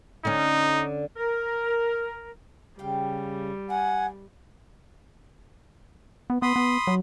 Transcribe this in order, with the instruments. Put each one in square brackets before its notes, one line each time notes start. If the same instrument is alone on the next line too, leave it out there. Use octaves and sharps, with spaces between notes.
[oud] D3 C#4 [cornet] D#4
[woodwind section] A#4
[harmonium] C#3 [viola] G3 [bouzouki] G4 F5 G5
[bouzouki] F#4 [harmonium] F#5 [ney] G#5
[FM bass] B3
[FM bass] B3 [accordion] B5 C6 D#6
[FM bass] B3
F#3